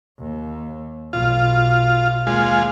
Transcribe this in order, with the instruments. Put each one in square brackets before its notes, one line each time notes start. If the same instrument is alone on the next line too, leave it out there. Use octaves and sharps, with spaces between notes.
[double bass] D#2
[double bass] B1 [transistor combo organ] F4
[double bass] D#2 [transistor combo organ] G#3 F4